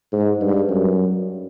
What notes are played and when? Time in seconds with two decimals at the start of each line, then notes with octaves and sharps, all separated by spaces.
0.12 G#2
0.41 G2
0.69 F#2